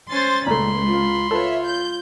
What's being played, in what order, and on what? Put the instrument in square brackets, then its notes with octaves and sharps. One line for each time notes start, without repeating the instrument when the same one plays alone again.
[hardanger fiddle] C#4 C5 [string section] C6 A6
[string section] C#2 [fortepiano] A#2 A3 [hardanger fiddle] B5 C6
[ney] F4
[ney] F4 [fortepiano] A4 B4 [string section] C#5 E5
[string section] G6